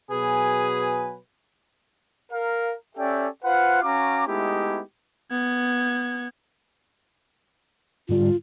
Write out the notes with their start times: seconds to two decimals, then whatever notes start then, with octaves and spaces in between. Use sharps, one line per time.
0.11 B2 F#3 G#4 B4 G#5
2.32 A#4 F5
2.97 C#4 G4 A4 D5 E5 G5
3.44 F4 B4 C5 F5 F#5
3.83 C#4 F#4 F5 A#5 D6
4.27 G#3 A3 B3 D#4 E4 G4
5.31 B3 G#6
8.09 G#2 D3 G3 F4